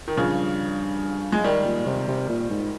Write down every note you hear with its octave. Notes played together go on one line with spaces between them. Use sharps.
D#3
G2 C#3 F3
G#3
D#3 G3
A#2
C3
C3
A#2
G#2